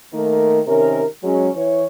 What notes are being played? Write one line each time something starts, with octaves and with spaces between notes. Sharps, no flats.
D#3 A3 A#3 A#4
C3 D#3 C#4 A#4
F#3 G#3 C#4
E3 C#5